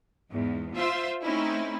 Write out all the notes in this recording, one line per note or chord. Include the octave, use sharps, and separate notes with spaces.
E2 G#2
F4 C5 E5 C6
A3 C4 C#4 D#4 E4